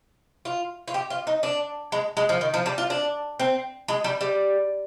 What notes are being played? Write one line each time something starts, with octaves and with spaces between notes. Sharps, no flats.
F4
F4
G4
F4
D#4
D4
G#3
G#3
F3
D#3
F3
G3
F4
D4
C4
G#3
G3
G3